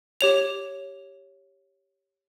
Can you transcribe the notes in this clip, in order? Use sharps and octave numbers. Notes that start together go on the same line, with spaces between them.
G4 C#5 F7